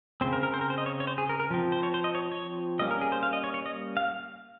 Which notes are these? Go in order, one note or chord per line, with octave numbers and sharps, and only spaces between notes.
C#3 F3 C4 C5
A#4
A#4
C5
A#4
C5
D#5
C#5
C#5
C5
G#4
A#4
A#4
F3 C4
C5
C#5
C5
D#5
C#5
C#5
G3 A#3 C#4 D#5
A#4
G#4
C5
F5
D#5
C#5
C#5
D#5
F5